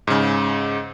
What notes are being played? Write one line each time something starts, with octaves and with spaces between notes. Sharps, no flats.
G#2 C#3